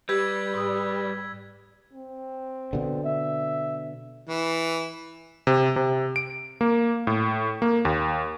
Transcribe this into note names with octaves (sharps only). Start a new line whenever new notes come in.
G3 G4 B4 E6 G#6 B6
G#2 D#6
C4
B2 D3
E5
E3
C3
C3
D7
A#3
A2
A#3
D#2